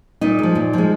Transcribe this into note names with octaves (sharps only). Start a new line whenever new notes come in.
A#2 D#4
F3 G#3
A#2
F3 G#3